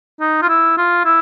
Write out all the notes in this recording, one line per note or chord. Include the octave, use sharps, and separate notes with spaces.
D#4
F4
E4
F4
E4